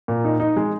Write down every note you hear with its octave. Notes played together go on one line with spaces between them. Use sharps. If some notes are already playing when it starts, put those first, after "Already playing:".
A#2
D#4
D#4
G#3